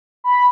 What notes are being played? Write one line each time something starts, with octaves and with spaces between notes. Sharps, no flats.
B5